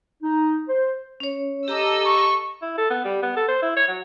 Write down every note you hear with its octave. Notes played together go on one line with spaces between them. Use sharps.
D#4
C5
C#4 C#5
G4 A4 D#5 A#5 D6 E6
C#6
E4
A4
B3
G3
B3
A4
C5
E4
C#5
F#3